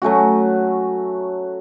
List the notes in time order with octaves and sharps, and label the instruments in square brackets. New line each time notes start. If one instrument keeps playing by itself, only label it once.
[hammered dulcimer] F#3 A3 C#4 F#4